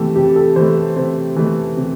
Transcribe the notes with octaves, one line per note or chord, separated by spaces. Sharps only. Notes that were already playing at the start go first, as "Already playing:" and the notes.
Already playing: C3 E3 A3 G4 A4
C3 G4
A4
E3 A3 C5
C3 C5
E3 A3
C3